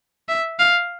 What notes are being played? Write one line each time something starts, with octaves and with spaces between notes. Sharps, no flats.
E5
F5